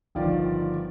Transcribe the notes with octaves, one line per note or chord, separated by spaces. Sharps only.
G1 D#3 F3 F4 D5